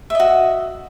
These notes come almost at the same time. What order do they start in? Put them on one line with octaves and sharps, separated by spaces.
E5 D#5 F#4